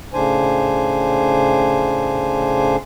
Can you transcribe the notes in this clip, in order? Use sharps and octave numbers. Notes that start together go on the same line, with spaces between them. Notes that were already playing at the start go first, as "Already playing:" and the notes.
A2 C#3 D4 C5 G#5